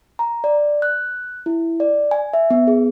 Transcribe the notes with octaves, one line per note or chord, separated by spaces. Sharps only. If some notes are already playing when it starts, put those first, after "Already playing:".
A#5
D5
F#6
E4
D5
G#5
E5
B3
G#4